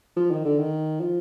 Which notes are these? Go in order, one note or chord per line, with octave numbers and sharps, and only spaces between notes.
F3
D#3
D3
D#3
F3